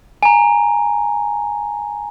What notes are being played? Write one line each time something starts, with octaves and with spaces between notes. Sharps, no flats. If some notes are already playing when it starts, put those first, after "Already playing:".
G#5 A#5